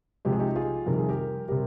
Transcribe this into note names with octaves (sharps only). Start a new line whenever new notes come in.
C3 F3 G#3 G4
G#4
D#4 G4
F4 G#4
F2 C3 D#3 G3 A#4
G#4
G4 A#4
C3 G3 G4 A#4